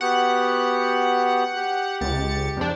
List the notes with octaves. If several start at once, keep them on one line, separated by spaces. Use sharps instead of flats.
B3 F#4 G4 F#5
G4
C#2 A6 C#7
F2 D4